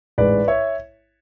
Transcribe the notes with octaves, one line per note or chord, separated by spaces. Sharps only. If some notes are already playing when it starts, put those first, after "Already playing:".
A1 G#2 G#3 B4 D5
C#5 E5